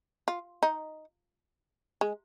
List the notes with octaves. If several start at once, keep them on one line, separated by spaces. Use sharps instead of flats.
F4
D#4
G#3